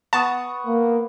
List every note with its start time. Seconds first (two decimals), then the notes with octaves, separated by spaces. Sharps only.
0.13 B3 F#5 A5 C#6 D#6
0.66 A#3